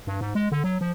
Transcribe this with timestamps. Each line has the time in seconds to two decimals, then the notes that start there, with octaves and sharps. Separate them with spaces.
0.07 G2
0.21 G#2
0.35 G#3
0.52 D3
0.64 F#3
0.81 F3